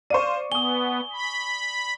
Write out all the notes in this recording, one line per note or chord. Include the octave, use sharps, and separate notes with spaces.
C5 D5 F5 C#6 D#7
B3 G#5 D#6 G7
B5